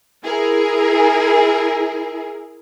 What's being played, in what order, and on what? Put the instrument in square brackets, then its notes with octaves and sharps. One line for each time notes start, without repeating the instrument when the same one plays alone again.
[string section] E4 G#4 A#4